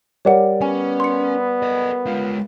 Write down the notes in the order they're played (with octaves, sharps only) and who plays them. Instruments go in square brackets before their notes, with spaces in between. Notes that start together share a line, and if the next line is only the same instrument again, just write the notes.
[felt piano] G3 A#4 D5 [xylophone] C#5 F#5
[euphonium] B3 [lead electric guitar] C#4 [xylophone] G#5
[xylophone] C6 C#7
[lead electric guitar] A4 D#5
[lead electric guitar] G#3 F4 [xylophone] F5